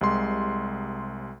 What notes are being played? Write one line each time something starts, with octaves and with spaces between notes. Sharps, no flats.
C2 C3 G#3 C6